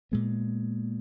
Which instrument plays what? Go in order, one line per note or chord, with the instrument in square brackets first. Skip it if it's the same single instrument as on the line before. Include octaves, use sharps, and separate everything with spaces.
[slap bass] A#2 G#3 B3